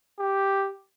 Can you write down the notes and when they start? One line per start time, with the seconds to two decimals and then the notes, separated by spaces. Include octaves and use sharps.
0.20 G4